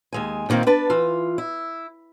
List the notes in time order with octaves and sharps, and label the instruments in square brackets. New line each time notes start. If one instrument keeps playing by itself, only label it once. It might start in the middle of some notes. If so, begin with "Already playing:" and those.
[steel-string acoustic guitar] D#2 G#3 G#5
A#2 D3 D#3 A#3 C4
D4 B4 A5
E3 F4
E4